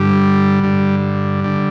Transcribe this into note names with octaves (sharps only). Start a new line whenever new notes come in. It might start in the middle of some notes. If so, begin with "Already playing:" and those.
Already playing: G2 D3 G3
G2 D3
D3 G3